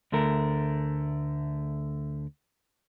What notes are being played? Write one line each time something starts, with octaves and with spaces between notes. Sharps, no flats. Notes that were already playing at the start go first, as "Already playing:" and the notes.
D2 D3 A3 A#4